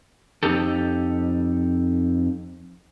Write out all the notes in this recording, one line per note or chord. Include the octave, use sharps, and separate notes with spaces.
F2 D#4 G4 A4